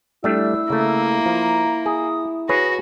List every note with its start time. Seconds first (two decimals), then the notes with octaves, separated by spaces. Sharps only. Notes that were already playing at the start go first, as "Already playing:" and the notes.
0.24 G3 A3 D4 E4 E6
0.70 C#3 A3 A#3
1.26 F3 A#5
1.86 G#4 D#6
2.49 F#4 G#4 B4 C#5 A#6